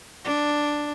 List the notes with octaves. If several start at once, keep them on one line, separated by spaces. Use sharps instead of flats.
D4